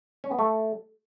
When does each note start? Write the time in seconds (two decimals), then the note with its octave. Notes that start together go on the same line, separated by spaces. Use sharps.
0.24 C#4
0.31 B3
0.39 A3